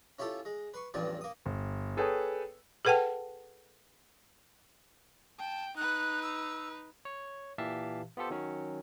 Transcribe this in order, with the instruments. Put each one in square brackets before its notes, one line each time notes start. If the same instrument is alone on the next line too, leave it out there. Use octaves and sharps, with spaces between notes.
[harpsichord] C#4 E4 F4 G4 A4
G#3
B4 C6 C#6
A1 E2 G2 F3 D5 G#5
A#3 D#6
[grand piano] G1
G#4 A4 B4 C#5 G5 D#6
[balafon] G#4 A4 B4 F#5 G5 A5
[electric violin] G5 [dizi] A5
[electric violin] D#4 B4 [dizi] F#6
[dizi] E6
[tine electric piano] C#5
A#2 E3 G4 E5 F5 A5
B3 F4 G4 A4 C5
D#3 F#3 C#4